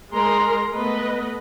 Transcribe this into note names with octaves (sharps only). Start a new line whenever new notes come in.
G#3 A#4 A#5 C6
A3 B3 B4 D#5